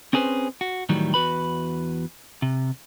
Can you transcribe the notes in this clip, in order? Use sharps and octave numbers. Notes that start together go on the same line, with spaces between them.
C4 C#4 G#4 B4 C5
F#4
A2 D#3 E3 F#3 G3
E2 F#4 B4 B5
C3